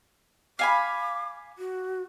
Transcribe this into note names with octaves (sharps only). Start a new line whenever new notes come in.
F5 G#5 B5 D6
F#4